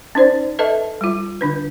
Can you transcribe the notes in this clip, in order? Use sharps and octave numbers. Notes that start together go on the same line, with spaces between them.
C#4 D#4 C5 D5
A4 B4 D#5 E5 A5
G3 F4
D3 D4 B4